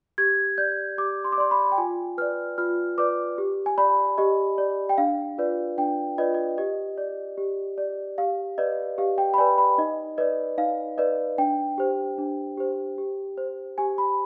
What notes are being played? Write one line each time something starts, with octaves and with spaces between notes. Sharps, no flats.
G4 G#6
D5 G6
G4 D6
C6
D6
D5 C6
B5
G5
F4 G#5
B4 D5 F6
F4 F6
B4 D5 D6
G4
G#5
D5 B5
G4 D#5
D5
G5
D4 F5
F4 B4 D5
D4 G5
F4 B4 D5 D#5
D#5
G4 D#5
D5
G4
D5
G4 F5
B4 D5 D#5
G4 F5
G5
B5
B4 D5 G#5
B5
D#4 D#5
B4 D5 D#5
D#4 F5
B4 D5 D#5
D4 G5
G4 C5
D4
G4 C5
G4
C5
G4 G#5
B5